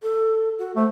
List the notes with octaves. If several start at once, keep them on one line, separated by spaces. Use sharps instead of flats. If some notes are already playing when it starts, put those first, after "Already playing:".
A4
F#4
A3 C5